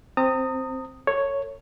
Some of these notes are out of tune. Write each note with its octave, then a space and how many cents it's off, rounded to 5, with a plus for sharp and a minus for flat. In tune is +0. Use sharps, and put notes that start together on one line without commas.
C4 +0 A#5 -40 D#6 +0
A4 +40 C#5 +0